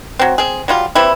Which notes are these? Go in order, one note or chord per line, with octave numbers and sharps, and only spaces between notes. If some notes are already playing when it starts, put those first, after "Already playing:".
F#3 C4
C4 G#4
F#3 G3 F4
E3 G3 C4 E4